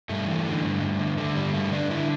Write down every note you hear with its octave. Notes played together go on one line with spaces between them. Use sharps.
G2 A3
E3
D3
G2
G2
D3
D3 A3
G2 G3
G2 A3
D3 D4
D3 E4